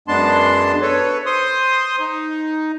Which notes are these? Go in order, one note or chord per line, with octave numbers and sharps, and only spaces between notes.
F#2 G#3 B3 D4 A5 C6
A4 B4 C#5
C5 C6 D#6
D#4